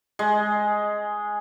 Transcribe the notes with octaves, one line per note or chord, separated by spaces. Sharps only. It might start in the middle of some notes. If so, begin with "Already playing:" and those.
G#3